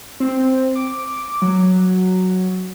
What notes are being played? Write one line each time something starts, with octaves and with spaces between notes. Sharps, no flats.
C4
D6
F#3